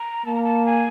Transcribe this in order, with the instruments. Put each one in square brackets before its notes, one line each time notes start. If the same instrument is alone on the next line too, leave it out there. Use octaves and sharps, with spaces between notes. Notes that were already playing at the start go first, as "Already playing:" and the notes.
Already playing: [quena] A#5
[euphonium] A#3 [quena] A5
[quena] A#5
A5
G#5